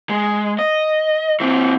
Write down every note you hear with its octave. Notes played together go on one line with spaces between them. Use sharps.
G#3
D#5
E3 C4